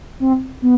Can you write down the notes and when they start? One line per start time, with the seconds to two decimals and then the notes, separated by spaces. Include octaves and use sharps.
0.20 C4
0.62 B3